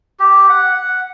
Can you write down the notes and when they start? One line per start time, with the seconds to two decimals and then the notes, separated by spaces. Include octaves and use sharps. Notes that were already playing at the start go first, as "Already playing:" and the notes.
0.20 G4
0.49 F#5
0.75 F#5